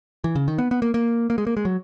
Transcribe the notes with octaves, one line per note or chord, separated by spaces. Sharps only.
E3
C#3
D#3
B3
B3
A#3
A#3
A#3
G#3
A#3
G#3
F#3